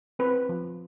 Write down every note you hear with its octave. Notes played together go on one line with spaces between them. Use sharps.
C4 B4
F3